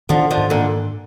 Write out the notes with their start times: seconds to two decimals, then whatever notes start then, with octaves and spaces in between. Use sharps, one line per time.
0.09 D3 D#3 F3
0.31 D3 F3
0.37 G#2
0.50 A#2 D3